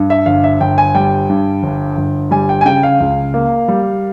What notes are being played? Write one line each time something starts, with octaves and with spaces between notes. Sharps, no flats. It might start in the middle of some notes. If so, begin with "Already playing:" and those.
Already playing: G2
E5
G1 F5
E5
G1 G5
G#5
G3 G5
G2
G1
G1
G3 G#5
G5
G#5
C#3 G5
F5
C#2
A#3
G3